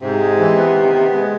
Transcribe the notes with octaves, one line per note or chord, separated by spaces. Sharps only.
G#2 C3
G#3
E3
B3
D#3
B3
G#3